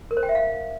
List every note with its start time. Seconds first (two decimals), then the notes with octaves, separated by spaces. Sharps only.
0.11 A#4
0.17 C5
0.23 G5
0.29 E5
0.35 F5